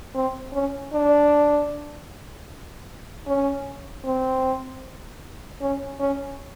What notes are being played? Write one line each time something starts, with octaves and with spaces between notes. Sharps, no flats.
C4
C#4
D4
C#4
C4
C#4
C#4